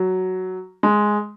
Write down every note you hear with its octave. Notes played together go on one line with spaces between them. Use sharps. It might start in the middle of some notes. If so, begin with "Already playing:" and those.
Already playing: F#3
G#3